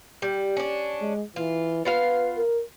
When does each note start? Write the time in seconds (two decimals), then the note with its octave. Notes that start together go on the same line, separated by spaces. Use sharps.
0.22 G3
0.57 C#4 D4
1.01 G#3
1.36 E3 F4
1.85 B3 F4 B4 F5
2.37 A#4